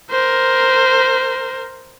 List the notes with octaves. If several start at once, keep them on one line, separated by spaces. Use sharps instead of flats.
A#4 C5